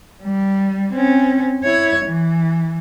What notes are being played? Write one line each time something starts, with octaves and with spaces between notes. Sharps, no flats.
G3
C4 C#4
E4 C#5
E3